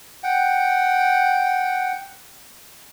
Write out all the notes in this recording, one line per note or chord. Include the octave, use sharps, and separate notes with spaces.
F#5 G5